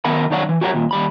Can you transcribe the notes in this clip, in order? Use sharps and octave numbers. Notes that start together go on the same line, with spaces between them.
D#3 B3 A#4 F#5 B5
C2 F#2 D#3 C#5 D5 F#5
E3
F#4 G4 A#4 C#5 F#5
D#2 A#2
D#2 G3 B5